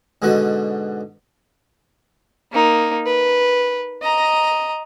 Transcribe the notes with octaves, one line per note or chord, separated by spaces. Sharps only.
G#2 B2 D3 F#4
A#3 D#4
B4
D#5 A#5